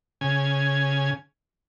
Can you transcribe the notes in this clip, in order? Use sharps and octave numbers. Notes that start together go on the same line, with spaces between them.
C#3 G#5